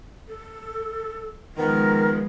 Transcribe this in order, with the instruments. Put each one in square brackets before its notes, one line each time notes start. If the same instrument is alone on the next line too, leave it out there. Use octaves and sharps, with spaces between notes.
[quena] A4
[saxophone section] D#3 B3 [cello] F3 G#3 [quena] A#4